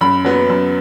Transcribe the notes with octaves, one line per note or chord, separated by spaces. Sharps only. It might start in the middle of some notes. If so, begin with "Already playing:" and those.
F#2 B5
F#3 B3
F#2